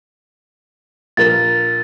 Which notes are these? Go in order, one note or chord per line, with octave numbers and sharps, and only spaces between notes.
A#1 A#4 A6